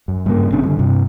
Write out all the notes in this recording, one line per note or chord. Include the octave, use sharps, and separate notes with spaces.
F#2
G2 C#3 A#3
A1 C#3 C4 D4
G2 D3
G2 C3